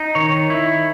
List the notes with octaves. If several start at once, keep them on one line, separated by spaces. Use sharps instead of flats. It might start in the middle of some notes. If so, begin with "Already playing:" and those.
Already playing: D#4
D#3 C#5
E4